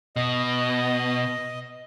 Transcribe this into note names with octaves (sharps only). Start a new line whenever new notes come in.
B2 D#5